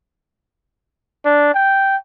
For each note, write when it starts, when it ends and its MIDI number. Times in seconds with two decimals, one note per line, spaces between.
1.25 1.54 62
1.54 1.97 79